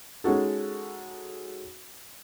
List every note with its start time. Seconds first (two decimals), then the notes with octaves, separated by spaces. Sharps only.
0.24 G#3 C#4 D#4 F#4 A4